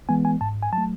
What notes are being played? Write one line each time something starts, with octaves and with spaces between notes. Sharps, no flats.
E3 G#3 B3 G#5
G#5
G#2 A5
G#5
F#3 A5
A3